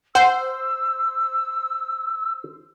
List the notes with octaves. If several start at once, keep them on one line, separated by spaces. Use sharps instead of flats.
C5 F#5 E6